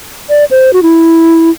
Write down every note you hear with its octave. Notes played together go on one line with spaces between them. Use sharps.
D5
C5
F#4
E4